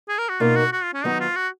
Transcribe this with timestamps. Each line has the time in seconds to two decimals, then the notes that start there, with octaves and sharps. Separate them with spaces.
0.08 G#4
0.18 A#4
0.29 F#4
0.40 B2 A#3 D#4 F4 A#4
0.56 F#4
0.73 F#4
0.83 F4
0.94 C#4
1.04 D#3 F#3 B3 D#4 F#4
1.20 F4
1.36 F#4